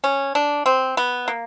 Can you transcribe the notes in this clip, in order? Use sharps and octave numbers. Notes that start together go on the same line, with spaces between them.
C#4
D4
C4
B3
A#3